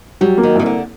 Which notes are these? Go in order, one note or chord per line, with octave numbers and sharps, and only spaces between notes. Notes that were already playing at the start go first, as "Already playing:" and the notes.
F#3 G3
A#3
D#3
C2 D#3
D3